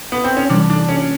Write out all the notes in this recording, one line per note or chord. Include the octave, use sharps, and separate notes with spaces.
B3
C4
C#4
C3 E3 G3 D4
D4
C#4